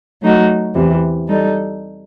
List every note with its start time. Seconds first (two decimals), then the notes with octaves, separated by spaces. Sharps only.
0.22 F#3 A3 D#4 F#4
0.75 E2 C3 E3
1.28 G3 D#4 A4